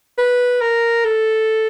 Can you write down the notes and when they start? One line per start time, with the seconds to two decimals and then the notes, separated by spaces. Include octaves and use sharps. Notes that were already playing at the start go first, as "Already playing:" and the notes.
0.18 B4
0.61 A#4
1.05 A4